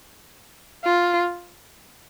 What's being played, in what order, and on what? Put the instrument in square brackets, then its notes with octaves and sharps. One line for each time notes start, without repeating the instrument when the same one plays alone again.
[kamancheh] F4